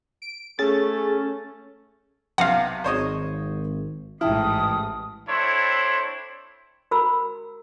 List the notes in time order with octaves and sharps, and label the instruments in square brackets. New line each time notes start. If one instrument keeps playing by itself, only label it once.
[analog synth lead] D7
[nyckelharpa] A3 [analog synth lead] C#4 [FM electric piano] G#4 A6
[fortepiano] B1 C3 F6 [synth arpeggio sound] F5 F#5
[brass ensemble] G#1 [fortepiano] C5 C#5 D#5
[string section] A1 G#2 E3 [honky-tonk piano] E4 [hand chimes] G5 A5 F6 [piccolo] D#6
[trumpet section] C4 D4 E4 A4 C5 C#5
[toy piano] F#4 A#4 A#5 B5 E6